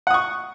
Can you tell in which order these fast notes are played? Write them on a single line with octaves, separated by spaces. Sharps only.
F#5 D#6 C#6